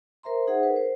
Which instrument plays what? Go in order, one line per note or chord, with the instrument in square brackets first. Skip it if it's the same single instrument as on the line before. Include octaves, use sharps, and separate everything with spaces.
[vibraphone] A#4 C5 E5 A#5 C6
D#4 G#4 C5 E5 F#5
A#4 B4
C5